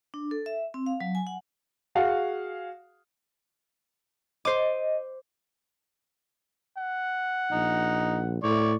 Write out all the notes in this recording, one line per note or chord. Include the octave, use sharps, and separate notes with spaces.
D4
A4
E5
C4
F5
F#3
G#5
F#5
F#4 G#4 F5 F#5
C5 D#5 D6
F#5
A#1 D#4
A2 D5 C#6